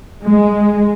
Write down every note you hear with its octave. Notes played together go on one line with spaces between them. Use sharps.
G#3